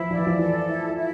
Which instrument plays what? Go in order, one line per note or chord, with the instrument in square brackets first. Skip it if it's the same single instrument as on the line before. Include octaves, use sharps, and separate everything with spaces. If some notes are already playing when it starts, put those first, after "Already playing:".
Already playing: [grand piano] E3 F3 [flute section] E4
[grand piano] F3 [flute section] D5
[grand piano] E3
F3
[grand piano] E3 [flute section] A4
[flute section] E4
E4